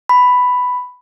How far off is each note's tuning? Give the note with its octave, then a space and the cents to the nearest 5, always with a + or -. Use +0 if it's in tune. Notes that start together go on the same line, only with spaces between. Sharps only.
B5 +5